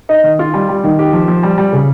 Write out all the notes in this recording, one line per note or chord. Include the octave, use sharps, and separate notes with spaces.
D#4
D#3
F4
G3
G3
D#3
G4
F3
F3
G3
G3
C#3